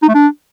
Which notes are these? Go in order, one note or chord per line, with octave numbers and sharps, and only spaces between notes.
D#4
A3
D4